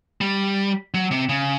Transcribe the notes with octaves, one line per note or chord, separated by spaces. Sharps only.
G3
F#3
C3
C#3